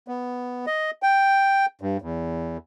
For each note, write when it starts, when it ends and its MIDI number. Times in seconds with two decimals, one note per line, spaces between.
0.08 0.66 59
0.67 0.91 75
1.03 1.66 79
1.81 1.97 43
2.02 2.57 40